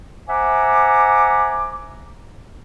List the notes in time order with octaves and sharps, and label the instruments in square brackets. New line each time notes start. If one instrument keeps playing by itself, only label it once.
[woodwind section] C5 E5 F#5 G#5 A#5 D6